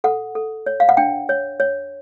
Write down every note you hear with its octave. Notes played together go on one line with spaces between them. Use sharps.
A4 F#5
A4
C#5
F5
F#5
D4 G5
C#5
C#5